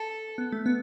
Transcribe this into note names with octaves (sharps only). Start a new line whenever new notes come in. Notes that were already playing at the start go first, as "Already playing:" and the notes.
Already playing: A4
B3
A3
B3